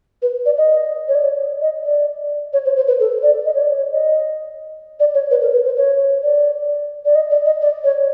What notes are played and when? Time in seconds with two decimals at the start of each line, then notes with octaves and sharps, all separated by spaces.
0.22 B4
0.45 D5
0.57 D#5
1.08 C#5
1.15 D5
1.62 D#5
1.84 D5
2.53 C#5
2.65 C5
2.76 C5
2.87 B4
3.00 A4
3.23 D5
3.45 D#5
3.54 C#5
3.61 D5
3.77 C#5
3.92 D#5
5.00 D5
5.14 C#5
5.31 B4
5.42 A#4
5.53 B4
5.65 C5
5.77 C#5
6.23 D5
7.05 D5
7.15 D#5
7.31 D5
7.46 D#5
7.61 D5
7.84 C#5